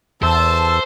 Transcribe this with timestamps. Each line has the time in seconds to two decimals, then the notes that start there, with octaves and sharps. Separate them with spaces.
0.23 E2 A4 C5 E5 A5 E6